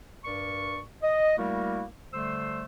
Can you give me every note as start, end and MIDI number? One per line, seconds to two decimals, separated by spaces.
0.24 0.79 43
0.24 0.79 70
0.24 0.79 74
0.24 0.79 85
1.02 1.35 75
1.37 1.83 55
1.37 1.83 57
1.37 1.83 58
1.37 1.83 64
1.37 1.83 66
1.37 1.83 70
2.12 2.63 50
2.12 2.63 55
2.12 2.63 57
2.12 2.63 72
2.12 2.63 84
2.12 2.63 88